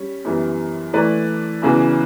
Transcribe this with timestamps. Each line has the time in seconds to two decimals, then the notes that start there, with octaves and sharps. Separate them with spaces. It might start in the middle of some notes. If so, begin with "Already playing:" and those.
Already playing: G3 C#4
0.25 F#2 E3 G3 B3
0.93 E3 A3 E4 B4 D5
1.62 E2 C#3 E3 B3 F#4